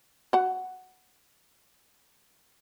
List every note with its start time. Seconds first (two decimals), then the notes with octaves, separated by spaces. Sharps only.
0.33 F#4 F#5